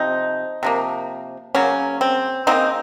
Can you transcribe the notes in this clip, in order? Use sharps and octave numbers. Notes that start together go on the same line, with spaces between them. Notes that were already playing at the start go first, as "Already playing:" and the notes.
Already playing: C3 F3 C4 D#4
C3 F3 A#3
C#3 F#3 A#3 C#4
C4
C#3 F#3 A#3 C4 D#4